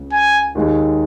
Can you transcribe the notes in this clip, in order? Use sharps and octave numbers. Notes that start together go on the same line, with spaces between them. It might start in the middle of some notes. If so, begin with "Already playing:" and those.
Already playing: C#2 C#3
G#5
D#2 D#3 G#3 D#4 G#4